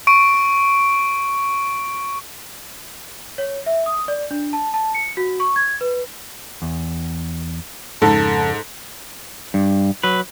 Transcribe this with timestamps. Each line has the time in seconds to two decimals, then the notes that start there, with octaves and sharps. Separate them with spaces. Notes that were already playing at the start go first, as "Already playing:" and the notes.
0.07 C#6 D7
3.38 C#5
3.66 E5
3.86 D#6
4.08 D5
4.31 D4
4.53 A5
4.74 A5
4.94 C#7
5.17 F#4
5.40 C#6
5.56 G#6
5.81 B4
6.62 E2
8.02 F2 G#2 C#3 A4 A5
9.54 G2
10.03 F#3 B4